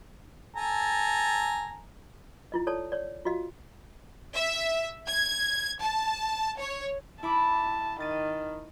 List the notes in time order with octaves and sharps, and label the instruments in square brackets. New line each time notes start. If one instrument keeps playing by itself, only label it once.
[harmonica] A4 G#5 A#5
[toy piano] E4 F4 D#5
A4 C#5 D5 A5
C#5 D5
F4 F#4 D#5 F5
[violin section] E5
G#6
A5
C#5
[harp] E4 B5 D6 [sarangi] A5
[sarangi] D#3 [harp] A6 D#7